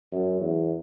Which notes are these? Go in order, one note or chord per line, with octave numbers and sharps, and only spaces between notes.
F#2
E2